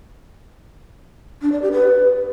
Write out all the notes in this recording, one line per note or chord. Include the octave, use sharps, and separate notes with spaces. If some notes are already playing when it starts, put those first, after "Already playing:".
D4
D5
G4
B4